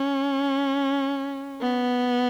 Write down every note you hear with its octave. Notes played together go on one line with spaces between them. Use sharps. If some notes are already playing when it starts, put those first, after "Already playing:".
Already playing: C#4
B3